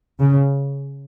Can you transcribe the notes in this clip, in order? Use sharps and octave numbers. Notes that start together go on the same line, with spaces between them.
C#3